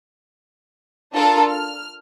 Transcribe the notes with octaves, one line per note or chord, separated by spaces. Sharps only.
D4 F4 A4 A#4 A5
F6